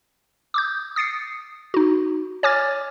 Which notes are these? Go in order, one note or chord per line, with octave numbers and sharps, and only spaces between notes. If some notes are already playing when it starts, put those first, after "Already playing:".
D6 D#6 G6
D#6 A6 C7 C#7
D#4 F#4
C#5 G#5 D6 F6 A6